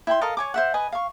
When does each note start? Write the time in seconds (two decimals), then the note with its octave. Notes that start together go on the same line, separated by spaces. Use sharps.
0.07 E4 G5 G#5 C6
0.21 A4 A#4 D#5 F5
0.37 C#5 G#5 D6
0.54 C5 E5 F#5
0.74 B4 D#5 G#5
0.92 F5 C#6